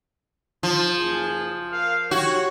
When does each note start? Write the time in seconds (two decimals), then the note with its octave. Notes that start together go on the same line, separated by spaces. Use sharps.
0.63 F3
0.98 F#1 G#4
1.72 A#4 F5
2.11 F#4 G4 C#5